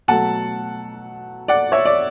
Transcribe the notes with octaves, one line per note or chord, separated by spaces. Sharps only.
B2 F#3 A3 F#5 A5
D5 F#5
C#5 E5
D5